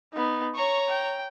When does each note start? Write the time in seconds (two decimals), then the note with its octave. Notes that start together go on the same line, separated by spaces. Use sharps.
0.13 B3 D#4
0.55 C#5 A#5 C#6
0.89 G5